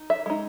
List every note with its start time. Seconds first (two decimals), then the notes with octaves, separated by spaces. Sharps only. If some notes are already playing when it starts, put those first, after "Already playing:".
Already playing: D#4
0.10 E5
0.26 G#3 D#4